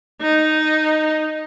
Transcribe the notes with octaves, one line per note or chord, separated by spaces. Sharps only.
D#4